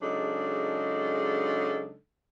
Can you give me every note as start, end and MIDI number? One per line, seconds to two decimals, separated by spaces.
0.02 1.96 49
0.02 1.96 54
0.02 1.96 56
0.02 1.96 62
0.02 1.96 63
0.02 1.96 69